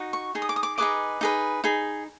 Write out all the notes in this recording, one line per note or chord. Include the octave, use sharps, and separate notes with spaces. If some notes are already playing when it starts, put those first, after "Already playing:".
Already playing: D#4 F#4
C#6
D#4 G#4
D#6
D6
D#6
D6
D#4 G#4 B4 D#5 D6
D#4 G#4 B4
D#4 G#4